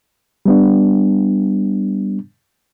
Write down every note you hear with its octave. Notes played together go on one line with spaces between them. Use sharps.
G3 B3 D4